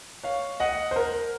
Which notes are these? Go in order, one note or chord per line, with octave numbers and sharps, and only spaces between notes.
C#5 F5
D#5 F#5
C5
A#4